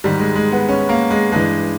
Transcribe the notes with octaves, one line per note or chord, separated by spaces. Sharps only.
G#2 D#3 G3
G#3
G#3
B3
C#4
A#3
G#3
G2 E3 G#3